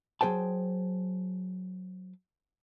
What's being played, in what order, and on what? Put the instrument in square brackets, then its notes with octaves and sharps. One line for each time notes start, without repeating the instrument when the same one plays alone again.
[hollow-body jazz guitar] F#3 G#4 C5 G5 A5